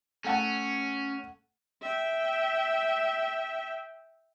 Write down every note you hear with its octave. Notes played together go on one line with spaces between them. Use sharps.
A3 C#4 F#5 A5
E5 G5